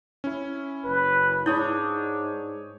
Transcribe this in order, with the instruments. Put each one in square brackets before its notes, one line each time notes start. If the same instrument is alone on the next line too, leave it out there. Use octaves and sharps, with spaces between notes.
[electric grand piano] C#4 E4
[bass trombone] F#1 [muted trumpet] B4
[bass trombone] G#2 [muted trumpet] D4 [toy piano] E4 [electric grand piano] C#5 D#6 G6